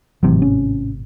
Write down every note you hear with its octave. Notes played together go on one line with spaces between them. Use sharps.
G#1 A2 C3 E3 F#3
C#4